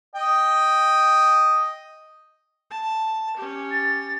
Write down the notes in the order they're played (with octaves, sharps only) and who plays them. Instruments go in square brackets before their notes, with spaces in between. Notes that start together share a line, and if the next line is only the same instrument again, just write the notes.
[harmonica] D#5 G5
[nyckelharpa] A5
C#4 G4
[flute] A6